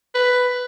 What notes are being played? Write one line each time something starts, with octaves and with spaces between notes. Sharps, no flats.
B4